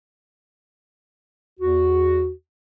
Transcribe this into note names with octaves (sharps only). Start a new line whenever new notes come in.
E2 F#4